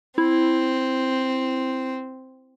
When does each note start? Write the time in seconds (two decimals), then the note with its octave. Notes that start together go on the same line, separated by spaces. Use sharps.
0.18 C4 E4